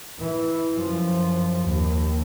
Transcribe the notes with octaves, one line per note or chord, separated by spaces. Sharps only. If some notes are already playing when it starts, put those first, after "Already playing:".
E3
F#2 F3
D#2